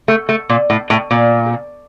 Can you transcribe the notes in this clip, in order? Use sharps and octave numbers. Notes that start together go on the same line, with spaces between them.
A3
A3
A#2
A2
A2
A#2